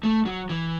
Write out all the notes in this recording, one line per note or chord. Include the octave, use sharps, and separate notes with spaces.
A3
F#3
E3